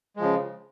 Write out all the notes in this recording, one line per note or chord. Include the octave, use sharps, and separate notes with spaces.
C#3 F3 G#3